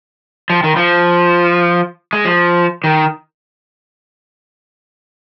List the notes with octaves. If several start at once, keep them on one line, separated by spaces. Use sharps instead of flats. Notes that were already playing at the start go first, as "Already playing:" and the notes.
F3
D#3
F3
G#3
F3
D#3